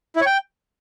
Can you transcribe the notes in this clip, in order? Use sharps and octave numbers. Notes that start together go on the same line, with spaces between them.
E4
C#5
G5